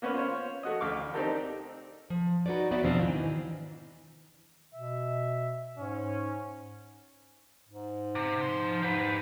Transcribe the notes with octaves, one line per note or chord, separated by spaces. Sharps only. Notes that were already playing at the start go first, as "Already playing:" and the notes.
A#3 B3 C#4 B4 C#5
F4 C5 C#5
A3 F#4 D#5
A1 D2 F5 C#6 D6
C4 D4 D#4 G4 A4 A#4
F3
D#4 F#4 B4 C#5 D5
B3 C4 F#4 D5 E5
E2 B2 F3 C4 D4 F5
G#2 D#3 E3
B2 E5
G#2 C#4
G#2
C3
F3 C6
G#2 G4 B4